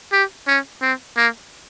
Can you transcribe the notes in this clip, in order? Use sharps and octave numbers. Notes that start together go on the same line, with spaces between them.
G4
C#4
C4
A#3